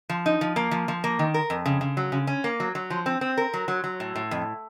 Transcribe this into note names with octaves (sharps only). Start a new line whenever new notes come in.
F3
D#4
F3
A#3
F3
F3
A#3
D#3
A#4
F2
C#3
C#3
F#3
C#3
C#4
A#3
F#3
F#3
F3
C4
C4
A#4
F#3
F#3
F#3
A2
A2
F2